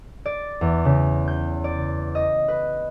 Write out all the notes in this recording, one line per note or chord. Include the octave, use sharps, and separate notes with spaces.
D5
E2
C#3
G6
D5
D#5
B4